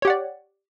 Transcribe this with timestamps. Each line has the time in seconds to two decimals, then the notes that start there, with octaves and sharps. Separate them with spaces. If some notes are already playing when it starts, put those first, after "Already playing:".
0.02 C#5
0.05 G4
0.07 F#5
0.10 D5